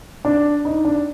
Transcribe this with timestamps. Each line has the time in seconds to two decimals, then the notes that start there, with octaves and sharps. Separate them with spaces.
0.25 D4
0.65 D#4
0.85 D4